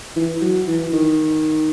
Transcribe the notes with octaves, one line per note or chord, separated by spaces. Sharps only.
E3
F#3
E3
D#3